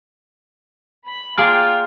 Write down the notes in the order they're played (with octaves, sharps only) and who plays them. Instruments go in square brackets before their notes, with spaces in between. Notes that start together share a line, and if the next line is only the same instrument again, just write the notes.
[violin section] B5
[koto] A#3 G#4 D5 [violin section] F4 G5 [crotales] F6